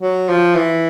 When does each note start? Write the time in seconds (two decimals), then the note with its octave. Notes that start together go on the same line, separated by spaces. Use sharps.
0.01 F#3
0.29 F3
0.55 E3